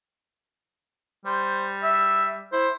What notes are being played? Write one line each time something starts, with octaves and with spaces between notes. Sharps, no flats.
G3 C5
E5
E4 C5